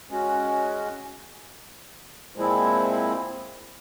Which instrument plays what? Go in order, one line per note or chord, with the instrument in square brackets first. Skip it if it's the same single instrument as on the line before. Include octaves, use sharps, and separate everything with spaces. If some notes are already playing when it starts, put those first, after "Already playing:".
[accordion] G#3 C#4 F#4
A#2 F3 G#3 C4 E4